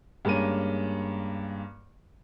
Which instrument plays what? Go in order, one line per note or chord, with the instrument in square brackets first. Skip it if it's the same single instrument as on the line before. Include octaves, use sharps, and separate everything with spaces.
[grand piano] G2 G#3 A#3 C#4 D#7